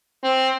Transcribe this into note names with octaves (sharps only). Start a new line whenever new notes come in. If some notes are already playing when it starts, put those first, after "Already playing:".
C4